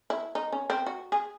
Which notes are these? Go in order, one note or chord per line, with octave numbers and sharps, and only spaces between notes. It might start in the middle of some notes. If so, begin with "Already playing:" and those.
E4
D#4
C#4
C4
F#4
G#4